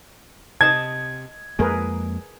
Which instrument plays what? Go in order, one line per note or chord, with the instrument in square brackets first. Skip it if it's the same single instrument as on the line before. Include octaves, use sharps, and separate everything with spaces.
[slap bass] C3 [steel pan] D#5 A5 [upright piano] G#6
[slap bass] F2 G#3 A#3 [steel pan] G#4 A#4 B4